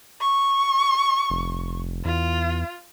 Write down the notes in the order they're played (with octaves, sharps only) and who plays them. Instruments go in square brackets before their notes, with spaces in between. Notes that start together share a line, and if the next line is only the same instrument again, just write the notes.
[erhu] C#6
[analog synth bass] F1
[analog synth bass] E2 [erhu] F4